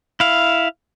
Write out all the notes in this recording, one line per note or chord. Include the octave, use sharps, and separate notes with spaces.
E4 F5